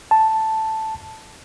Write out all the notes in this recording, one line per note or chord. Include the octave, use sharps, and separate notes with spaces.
A5